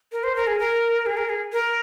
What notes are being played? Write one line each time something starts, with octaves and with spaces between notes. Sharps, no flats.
A#4
C5
A#4
G#4
A#4
G#4
A#4
G#4
A#4